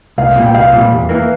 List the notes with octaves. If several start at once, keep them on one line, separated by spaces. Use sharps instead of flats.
C2 F5
A#2 G3
G5
C2 F5
A#2 G3
E2
E3 A#3